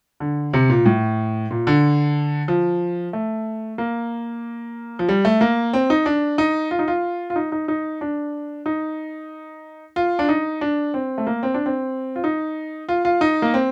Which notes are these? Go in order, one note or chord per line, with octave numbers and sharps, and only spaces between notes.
D3
C3
A#2
A2
A#2
D3
F3
A3
A#3
F3
G3
A3
A#3
C4
D#4
D4
D#4
F4
D#4
F4
F4
D#4
D#4
D#4
D4
D#4
F4
D4
D#4
D4
C4
A3
A#3
C4
D4
C4
F4
D#4
F4
F4
D#4
A#3
C4